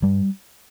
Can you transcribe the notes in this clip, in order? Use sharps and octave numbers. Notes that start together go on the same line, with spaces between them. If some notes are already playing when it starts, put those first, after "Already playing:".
G2 G3